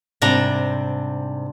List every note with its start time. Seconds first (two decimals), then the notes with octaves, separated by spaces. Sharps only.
0.22 G#2 C3 G3 D4 A#5